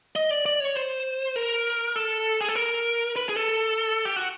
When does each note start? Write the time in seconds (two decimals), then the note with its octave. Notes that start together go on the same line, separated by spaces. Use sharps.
0.16 D#5
0.31 D5
0.46 D5
0.60 C#5
0.75 C5
1.36 A#4
1.96 A4
2.41 G#4
2.49 A4
2.55 A#4
3.16 B4
3.29 G#4
3.36 A4
4.05 G4
4.16 F#4